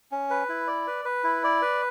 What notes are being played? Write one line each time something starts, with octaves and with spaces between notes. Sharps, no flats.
C#4
B4
E4
D5
B4
B4
E4
D5
B4